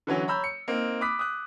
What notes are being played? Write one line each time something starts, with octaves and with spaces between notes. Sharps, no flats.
D3 E3 F#3 C#4
C#5 A#5 B5 E6 G6
C#7
A#3 C4 D#4
B5 D6 D#6 F#6 B6
D#6 F#6